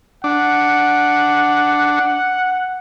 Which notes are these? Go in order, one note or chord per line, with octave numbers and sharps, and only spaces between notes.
D4 F#5